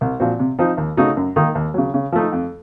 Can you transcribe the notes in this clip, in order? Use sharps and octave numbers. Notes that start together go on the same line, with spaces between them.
C2
A#2 F3 C4 F#4
C3
F3 C4 D#4
D#2
C#3 A3 D#4 F#4
F#2
D#3 A#3 D#4
D#2
C#3 F#3
C#3
F3 A3 D#4
F2